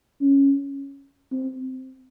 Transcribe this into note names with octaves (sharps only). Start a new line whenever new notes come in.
C#4
C4